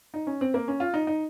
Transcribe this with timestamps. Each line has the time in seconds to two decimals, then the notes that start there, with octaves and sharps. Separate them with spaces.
0.14 D#4
0.27 C#4
0.41 C4
0.54 A#3
0.68 C#4
0.80 F4
0.94 D#4
1.07 D#4